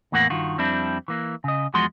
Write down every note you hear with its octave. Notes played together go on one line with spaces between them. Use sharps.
E2 A2 E3 A#3 F#5
G2 D#3 F4 F#4
F2 G3 C4 D4 E4
E3 A#3
C#3 D#5
E2 F3 G#3 F#4 C6